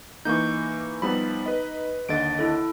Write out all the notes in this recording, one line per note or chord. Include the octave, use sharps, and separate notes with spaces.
E3 A#3 D#4 C#6 G6
F3 G3 B3 D#4 B5
B4 D#5
D#2 D3 D#5 A6 D7
E4 A4